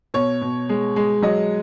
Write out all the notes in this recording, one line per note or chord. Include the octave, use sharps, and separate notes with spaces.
B2 C#5
B2
G#3
G#3
F#3 D#5